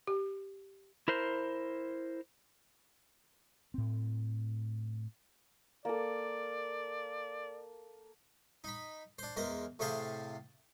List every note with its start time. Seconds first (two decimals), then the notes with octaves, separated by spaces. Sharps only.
0.07 G4
1.08 E4 A#4 C5
3.74 A2 C4
5.85 A#3 A4 D5
8.64 D#4 B5
9.19 D4 C5
9.36 E2 G#3 A#4 C5
9.79 A2 C3 G#4 C5 F5 A5